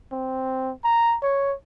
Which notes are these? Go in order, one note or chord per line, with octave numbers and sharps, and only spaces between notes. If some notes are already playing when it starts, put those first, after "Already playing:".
C4
A#5
C#5